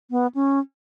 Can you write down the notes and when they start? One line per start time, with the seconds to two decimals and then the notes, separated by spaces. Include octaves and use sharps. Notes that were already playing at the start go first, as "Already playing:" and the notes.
0.11 B3
0.35 C#4